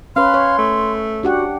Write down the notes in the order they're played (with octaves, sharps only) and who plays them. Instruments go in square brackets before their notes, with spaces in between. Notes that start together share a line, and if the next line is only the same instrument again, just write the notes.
[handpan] C#4 B4 [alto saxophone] F5 [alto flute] C6
[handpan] C#5
[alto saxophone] A3
[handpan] D4 G4 F#5 [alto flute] F#4